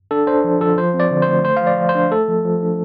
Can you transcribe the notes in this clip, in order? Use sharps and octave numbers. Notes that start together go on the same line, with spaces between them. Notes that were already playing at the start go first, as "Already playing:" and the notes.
D4 A4
D4 C5
F3
F3 A4
F3 C5
C4
D5
D3
C5
A3
A3 C5
F3 F5
D5
F3
C5
D4
A3 A4
F3
F3
D4